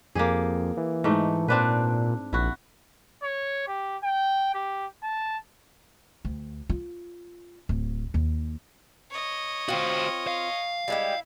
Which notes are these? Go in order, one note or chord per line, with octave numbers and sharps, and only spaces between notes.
F2 A#3 G4 G#4
E3
G#2 A3 D#4
A#2 C4 D4 B4
A#1 E4 F#4
C#5
G4
G5
G4
A5
D2
F4
D1
D#2
C#5 D#5
C4 F4 F#4 C5
F5
G3 G#3 E4 G4